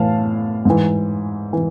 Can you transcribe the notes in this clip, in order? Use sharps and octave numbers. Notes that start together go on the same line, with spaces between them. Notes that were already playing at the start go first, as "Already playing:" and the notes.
Already playing: A2 E3 F5 A5
G#2 E3
E3